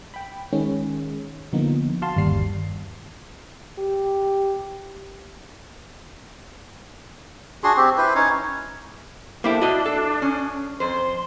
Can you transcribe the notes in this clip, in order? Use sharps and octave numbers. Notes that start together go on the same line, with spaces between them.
G5 B5
D#3 G#3 C#4
D3 F3 A#3 B3 D#4
F#4 F5 A5 C6
G1 D#2 G3 C7
G4
D4 F#4 G#4 C6
C4 G4
E4 B4 C5
C#4 D#4 C#5
A#3 D4 E4 G4 A4 C5 G5
F#4 D#5 E5
A4
C#4
F2 C5 C6